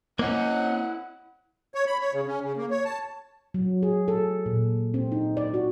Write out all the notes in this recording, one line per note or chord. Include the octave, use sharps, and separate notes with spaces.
A#3 C4 C#4 E4 D#5 F#5
C#5
B5
C#5
C#3
C#4
C#3
A#3
C#5
A5
F#3
G#4
A4
A#2
C4
D#4
D5
F#4